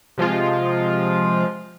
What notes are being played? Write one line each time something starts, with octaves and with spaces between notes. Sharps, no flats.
C3 F3 G#3 F4